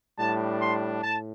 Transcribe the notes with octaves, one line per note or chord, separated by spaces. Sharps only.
A2 G3 D4 A5
C6
A2 A5